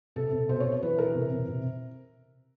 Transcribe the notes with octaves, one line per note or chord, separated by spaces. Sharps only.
C3 A4
C3
B2 C5
C#5
B2
E3 B4
E3 A#4
C3
C3
C3